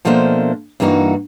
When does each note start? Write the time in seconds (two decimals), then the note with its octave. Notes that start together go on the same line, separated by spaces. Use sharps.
0.05 B2 F3 A3 A#3 D4 C5
0.80 G2 E3 A#3 D#4 E4 F#4